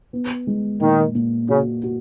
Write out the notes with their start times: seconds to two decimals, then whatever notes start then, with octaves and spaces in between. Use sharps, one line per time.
0.13 B3
0.47 G#3
0.81 A#2 D#3
1.15 A#2
1.49 C#3 F#4
1.83 F#4